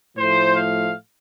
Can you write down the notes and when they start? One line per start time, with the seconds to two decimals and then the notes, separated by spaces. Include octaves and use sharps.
0.17 A2 F3 A3 C5
0.56 F5